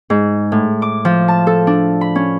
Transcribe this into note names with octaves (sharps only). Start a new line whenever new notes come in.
G#2
A2
D6
F3
A5
A4
D4
B5
C#4